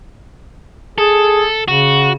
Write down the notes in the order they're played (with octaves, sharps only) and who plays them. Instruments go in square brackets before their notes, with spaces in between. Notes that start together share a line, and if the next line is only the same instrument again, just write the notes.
[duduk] G#4 [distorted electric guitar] A4
[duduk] C#3 [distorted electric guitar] F#4